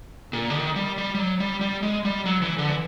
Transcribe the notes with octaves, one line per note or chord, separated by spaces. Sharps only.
A#2
D3
D#3
G3
G3
G3
F#3
G3
G3
G#3
G3
F#3
E3
D3
E3